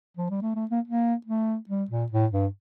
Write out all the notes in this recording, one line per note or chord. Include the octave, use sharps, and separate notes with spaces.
F3
G3
A3
A3
A#3
A#3
A3
G3
A#2
A2
G2